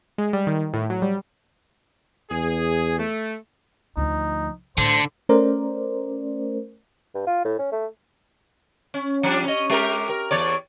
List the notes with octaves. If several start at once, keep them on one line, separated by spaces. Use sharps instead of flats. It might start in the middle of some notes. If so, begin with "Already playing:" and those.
G#3
G3
D#3
A2
F#3
G3
E2 G#4
A3
D2 F3 D#4
A2 D3 C5
A3 C#4 A#4 C5 D5
G2
F4
A2
C#4
A3
C#4
F3 G3 D4
C#4 D#5
G#3 G4 A#4
A#4
E2 C#5 D5